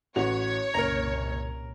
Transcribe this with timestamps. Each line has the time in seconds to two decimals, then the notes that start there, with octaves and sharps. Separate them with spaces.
0.16 A1 F#4 C#5 F7
0.74 F#1 C2 A#2 A#4 A#5